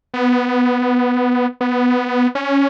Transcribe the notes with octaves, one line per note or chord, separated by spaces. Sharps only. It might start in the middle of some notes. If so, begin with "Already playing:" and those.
B3
B3
C#4